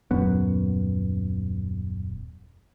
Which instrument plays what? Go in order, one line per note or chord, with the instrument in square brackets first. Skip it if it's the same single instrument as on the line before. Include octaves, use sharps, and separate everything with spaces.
[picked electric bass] D#1 F#2 B3